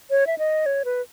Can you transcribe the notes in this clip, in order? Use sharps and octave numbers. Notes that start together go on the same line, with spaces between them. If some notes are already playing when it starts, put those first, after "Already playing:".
C#5
E5
D#5
C#5
B4